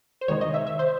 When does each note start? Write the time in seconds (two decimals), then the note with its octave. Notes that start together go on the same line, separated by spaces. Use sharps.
0.21 C5
0.28 C3 D#3 G#3 D#4 C#5
0.41 D#5
0.54 E5
0.67 E5
0.79 C5